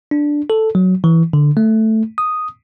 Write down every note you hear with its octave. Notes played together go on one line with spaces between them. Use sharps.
D4
A4
F#3
E3
D3
A3
D#6